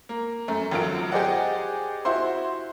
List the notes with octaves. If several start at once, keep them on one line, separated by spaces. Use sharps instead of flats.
A#3
F#2 A3
G#1 F#3 F4 A4 D7
G4 G#4 C5 D5 D#5 F#5
E4 F#4 C5 C6